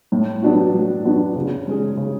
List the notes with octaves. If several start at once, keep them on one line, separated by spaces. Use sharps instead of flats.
A2
F#3 B3 D4 F#4
A2
F#3 B3 D4 F#4
C#3
G#3 C#4 G#4
C#3